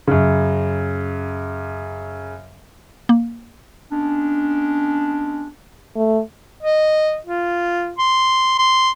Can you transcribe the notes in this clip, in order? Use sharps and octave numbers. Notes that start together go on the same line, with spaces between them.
F#2 C#3
A#3
G#3 B3 C#4 D4
A3
D#5
F4
C6
C6